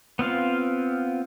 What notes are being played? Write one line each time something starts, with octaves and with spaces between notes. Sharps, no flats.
B3 C4 F4 F5